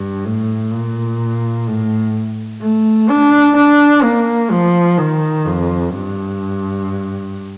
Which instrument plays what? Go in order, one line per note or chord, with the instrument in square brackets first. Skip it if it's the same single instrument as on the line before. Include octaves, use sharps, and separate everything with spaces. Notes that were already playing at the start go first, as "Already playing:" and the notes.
Already playing: [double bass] G2
A2
A#2
A2
A3
D4
D4
A#3
F3
D#3
F2
G2